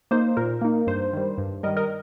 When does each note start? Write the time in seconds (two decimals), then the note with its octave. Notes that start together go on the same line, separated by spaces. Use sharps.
0.11 A#3 D#4 C5
0.37 A#2 A#4
0.61 A#3 D#4
0.87 G2 C5
1.13 D#3 G3
1.38 G2
1.63 D#3 G3 A#4 D#5
1.77 A#4 D#5